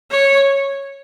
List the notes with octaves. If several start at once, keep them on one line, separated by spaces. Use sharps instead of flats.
C#5